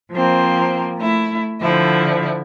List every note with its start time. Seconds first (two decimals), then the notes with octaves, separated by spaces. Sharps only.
0.12 F3 A#3 C4
0.99 A3 E4
1.60 D3 F3 E4